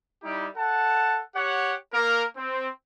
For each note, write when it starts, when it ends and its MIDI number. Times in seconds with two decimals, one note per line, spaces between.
0.24 0.49 55
0.24 0.49 63
0.24 0.49 64
0.24 0.49 67
0.57 1.21 69
0.57 1.21 78
0.57 1.21 81
1.36 1.74 67
1.36 1.74 73
1.36 1.74 78
1.94 2.24 58
1.94 2.24 70
2.37 2.68 60